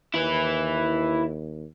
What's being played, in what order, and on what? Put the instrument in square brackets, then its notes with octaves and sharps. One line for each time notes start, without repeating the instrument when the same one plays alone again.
[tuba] D#2 [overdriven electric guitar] E4 B4